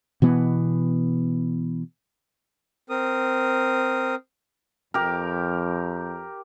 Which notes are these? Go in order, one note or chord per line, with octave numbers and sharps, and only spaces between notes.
B2 E3 B3
C4 A#4 D#6
F2 G4 A#4